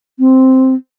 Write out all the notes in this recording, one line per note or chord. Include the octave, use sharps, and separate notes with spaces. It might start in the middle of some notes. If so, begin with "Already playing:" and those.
C4